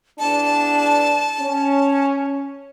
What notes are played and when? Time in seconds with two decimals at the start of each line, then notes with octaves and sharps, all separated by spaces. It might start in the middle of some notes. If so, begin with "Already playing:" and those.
0.19 E2 D4 A5
1.40 C#4